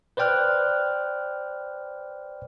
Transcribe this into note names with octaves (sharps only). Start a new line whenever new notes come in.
B4 C5 D5 G5 F6 F#6